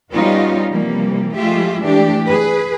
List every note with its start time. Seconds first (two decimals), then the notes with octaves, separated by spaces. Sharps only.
0.12 G3 B3 C#4 D#4 F4 F#4
0.69 C3 E3 F3 G3 A#3
1.35 F3 G#3 A3 F4 G4 E5
1.82 E3 A3 D4 G4
2.27 G#4 B4